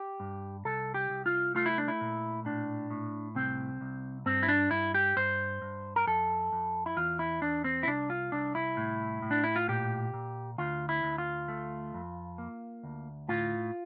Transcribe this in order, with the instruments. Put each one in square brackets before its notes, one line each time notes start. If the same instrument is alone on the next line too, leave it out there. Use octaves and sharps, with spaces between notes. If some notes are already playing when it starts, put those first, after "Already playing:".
Already playing: [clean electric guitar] G4
G2
C2 A4
G4
C2
F4
A3 F4
E4
D4
E4
A#2
A2 D4
A2
C2 C4
C2
G2 C4
E4
D4
G2 E4
G4
G2 C5
G2
A#4
F2 A4
F2
E4
E2 F4
E4
E2 D4
C4
E4
C2 D4
F4
C2 D4
E4
A2
A2
D4
E4
F4
A#2 G4
A#2
D2 F4
E4
D2
F4
A3
F2
A#3
D2
A2 F4